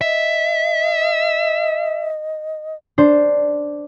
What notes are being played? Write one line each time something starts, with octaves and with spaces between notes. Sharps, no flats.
D#5 E5
D4 C5